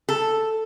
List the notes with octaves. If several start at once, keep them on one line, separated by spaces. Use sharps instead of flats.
A4